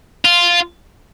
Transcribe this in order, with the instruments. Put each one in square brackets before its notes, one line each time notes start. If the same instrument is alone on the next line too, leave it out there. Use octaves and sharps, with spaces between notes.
[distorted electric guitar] F4